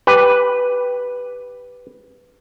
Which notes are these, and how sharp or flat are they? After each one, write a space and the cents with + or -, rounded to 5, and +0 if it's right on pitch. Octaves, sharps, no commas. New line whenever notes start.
G4 +0 B4 +0